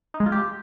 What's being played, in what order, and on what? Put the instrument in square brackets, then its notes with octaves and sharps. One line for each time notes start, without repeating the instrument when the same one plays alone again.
[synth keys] D#4
G#3
F4
G4